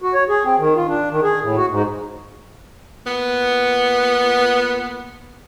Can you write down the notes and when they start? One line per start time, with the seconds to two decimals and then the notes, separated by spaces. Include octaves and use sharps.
0.02 F#4
0.14 C#5
0.29 G#4
0.45 C4
0.58 D#3
0.76 F4
0.88 D4
1.11 D#3
1.23 G#4
1.42 A2
1.57 F#4
1.70 G#2
3.05 A#2 B3